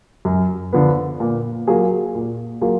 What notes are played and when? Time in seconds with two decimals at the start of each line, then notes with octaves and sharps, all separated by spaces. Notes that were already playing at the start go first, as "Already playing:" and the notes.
0.25 F#2
0.73 D3 F3 B3
1.20 A#2
1.67 F#3 A#3 F4 G#4
2.15 A#2
2.61 F#3 A#3 F4 G#4